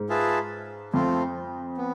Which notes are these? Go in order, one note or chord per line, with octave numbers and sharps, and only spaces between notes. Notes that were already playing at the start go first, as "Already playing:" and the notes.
Already playing: G#2
F4 G#4 B4 E5 A5
F2 A3 C4 F4
B3